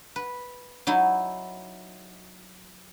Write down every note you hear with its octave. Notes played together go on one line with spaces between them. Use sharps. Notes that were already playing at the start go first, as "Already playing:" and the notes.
B4
F#3 D#4 E4